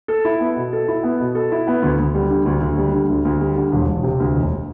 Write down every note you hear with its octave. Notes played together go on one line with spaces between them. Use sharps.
A4
E4
B3
B2
A4
E4
B3
B2
A4
E4
B3
D2
D2
G3
D3
D2
D2
G3
D3
D2
D2
G3
D3
E1
E1
C3
D2
E1